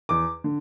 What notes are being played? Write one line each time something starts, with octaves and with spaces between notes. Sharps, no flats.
E2 D6
D3